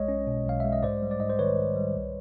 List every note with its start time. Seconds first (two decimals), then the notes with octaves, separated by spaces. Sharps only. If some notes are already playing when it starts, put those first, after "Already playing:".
Already playing: B1 G#3 C#5 D#5
0.08 C#4
0.27 B2
0.47 B1 F5
0.60 G#3 E5
0.72 D#5
0.83 G#2 C5 D5
1.02 G3
1.11 D5
1.20 G#2 D#5
1.30 C5 D5
1.39 D#3 B4 C#5
1.57 G#2
1.76 G3
1.95 C2